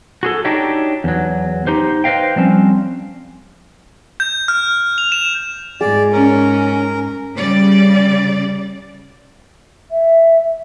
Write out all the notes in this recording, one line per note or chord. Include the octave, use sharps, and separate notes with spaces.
F#4 G#4 A4
D4 D#4 F#4 G4 C#5 D#5
E2 F#3
D#4 G4 C5
B4 C5 D5 D#5 F5 G5
F3 G3 C4 C#4
G6
F6
F7
E7
G#2 G#4 D5
C#4 A#4
C#3 G3 D5
E5